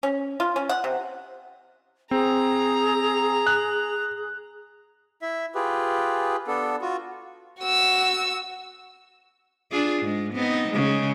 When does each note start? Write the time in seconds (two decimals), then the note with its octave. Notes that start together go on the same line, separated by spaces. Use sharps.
0.03 C#4
0.40 F4
0.56 C#4
0.69 F#5
0.84 C3
2.11 C4 G#4 A#5
3.47 F#6
5.22 E4 E5
5.55 F4 G4 G#4 B4
6.47 B3 D4 A4
6.82 F4 F#4
7.61 F#4 E6
9.71 D4 F4 G#4
10.03 G#2 G#3
10.33 B3 C4 D#4
10.69 C#3 G#3